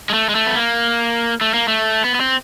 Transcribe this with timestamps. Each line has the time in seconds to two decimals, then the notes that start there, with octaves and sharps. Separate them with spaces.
0.10 G#3
0.14 A3
0.29 G#3
0.35 A3
0.46 B3
0.57 A#3
1.41 A3
1.54 A#3
1.68 A3
2.04 B3
2.15 B3
2.21 C4